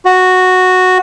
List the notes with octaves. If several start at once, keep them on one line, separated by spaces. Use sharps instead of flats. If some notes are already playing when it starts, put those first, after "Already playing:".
F#4